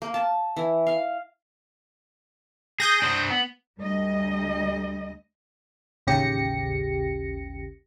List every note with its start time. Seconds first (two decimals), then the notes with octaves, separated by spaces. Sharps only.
0.02 A#3
0.14 A5
0.57 E3
0.87 F5
2.80 G#4 D#6 G6 A#6
3.02 D4 C5
3.29 B3
3.79 D2 G3 D#5
6.07 A1 D#2 C#3 G4 A#6 C#7